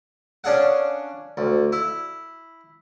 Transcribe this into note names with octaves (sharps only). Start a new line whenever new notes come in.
C#4 D4 G#4 F5 F#5
D2
E4